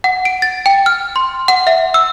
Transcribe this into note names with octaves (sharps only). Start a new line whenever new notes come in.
F#5
D7
A6
G5
F6
C6
F#5
E5
E6